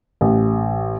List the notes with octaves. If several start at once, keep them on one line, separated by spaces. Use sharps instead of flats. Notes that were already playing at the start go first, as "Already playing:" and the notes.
A1